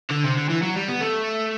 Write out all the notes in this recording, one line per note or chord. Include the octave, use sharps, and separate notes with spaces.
D3
C3
D3
E3
F#3
G3
B3
A3